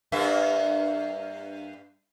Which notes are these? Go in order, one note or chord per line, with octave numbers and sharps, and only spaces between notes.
G2 A#3 E5